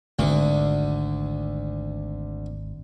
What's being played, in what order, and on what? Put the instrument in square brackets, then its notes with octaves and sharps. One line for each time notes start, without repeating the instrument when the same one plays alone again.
[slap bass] G#1 [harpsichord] D2 D3